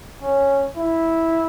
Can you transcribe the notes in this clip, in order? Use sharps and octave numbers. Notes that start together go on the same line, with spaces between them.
C#4
E4